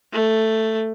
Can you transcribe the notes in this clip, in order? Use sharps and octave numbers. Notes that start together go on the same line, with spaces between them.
A3